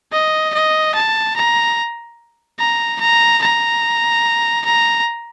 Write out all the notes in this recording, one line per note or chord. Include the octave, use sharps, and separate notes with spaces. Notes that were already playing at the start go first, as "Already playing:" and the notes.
D#5
D#5
A5
A#5
A#5
A#5
A#5
A#5